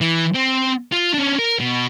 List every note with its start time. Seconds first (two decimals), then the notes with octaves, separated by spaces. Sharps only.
0.01 E3
0.34 C4
0.92 F4
1.14 C#4 D4
1.39 A#4
1.59 B2